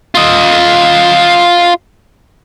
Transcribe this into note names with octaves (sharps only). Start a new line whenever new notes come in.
F4 D#5